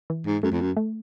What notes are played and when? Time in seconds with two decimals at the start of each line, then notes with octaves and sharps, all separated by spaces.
0.10 E3
0.26 G#2
0.43 F#2 A3
0.52 F2
0.61 F#2
0.77 A3